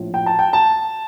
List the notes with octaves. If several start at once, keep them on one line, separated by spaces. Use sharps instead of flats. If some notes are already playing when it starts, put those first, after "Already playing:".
Already playing: A#1 A2 F3
G5
A5
G5
A5